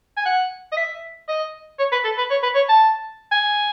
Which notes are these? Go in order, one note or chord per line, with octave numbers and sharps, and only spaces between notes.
G#5
F#5
D#5
E5
D#5
C#5
B4
A4
B4
C#5
B4
C#5
A5
G#5